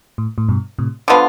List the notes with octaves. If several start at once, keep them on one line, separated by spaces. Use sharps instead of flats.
A2
A2
G2 B2
A2 C3
D3 F3 B3 F4